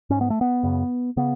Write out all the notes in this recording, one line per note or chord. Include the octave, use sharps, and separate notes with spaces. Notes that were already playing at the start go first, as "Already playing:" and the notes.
G#2 C#4
B3
A3
B3
F#2 C#3
C#3 B3